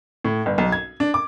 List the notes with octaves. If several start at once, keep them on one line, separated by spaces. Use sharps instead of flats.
A2
G1
B1
G#6
D4
D6